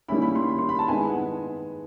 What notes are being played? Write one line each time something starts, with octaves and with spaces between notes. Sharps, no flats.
D#3 G3 A#3 C#4 E4 B5
B5
C6
B5
C6
B5
A5
D#3 G#3 B3 E4 G#5
F#5